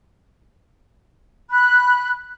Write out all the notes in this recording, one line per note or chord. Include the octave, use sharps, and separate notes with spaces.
B5 F#6